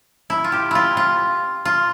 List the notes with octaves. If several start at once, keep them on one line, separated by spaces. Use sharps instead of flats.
E4
F4
G4
E4 F4
F4
F4